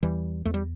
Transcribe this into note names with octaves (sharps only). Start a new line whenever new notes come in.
E2 E3 G3
E2 A3
G3